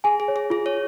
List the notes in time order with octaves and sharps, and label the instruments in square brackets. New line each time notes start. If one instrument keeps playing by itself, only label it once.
[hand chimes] G#4 [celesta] G#5
[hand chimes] G#4
[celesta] C#5
[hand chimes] G#4
[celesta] F4 [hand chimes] G#4
[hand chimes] C#5